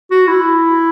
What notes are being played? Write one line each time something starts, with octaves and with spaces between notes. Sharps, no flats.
F#4
E4